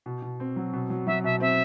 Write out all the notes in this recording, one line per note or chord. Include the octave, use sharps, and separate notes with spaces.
B2
B2
C4
F#3
B2
F#3
F#3 E5
B2 E5
C4 E5